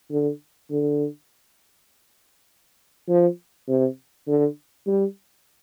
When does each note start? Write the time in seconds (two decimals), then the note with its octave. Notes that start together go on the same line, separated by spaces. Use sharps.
0.11 D3
0.70 D3
3.08 F3
3.68 C3
4.27 D3
4.86 G3